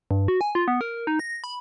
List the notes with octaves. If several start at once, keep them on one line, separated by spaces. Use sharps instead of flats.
G2
F#4
G#5
F4
B3
A#4
D#4
A#6
B5